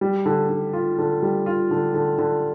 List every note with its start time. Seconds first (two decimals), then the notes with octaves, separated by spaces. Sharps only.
0.01 G3
0.26 D3
0.49 D3
0.73 F4
0.98 D3
1.22 G3
1.46 F4
1.71 D3
1.94 D3
2.18 D3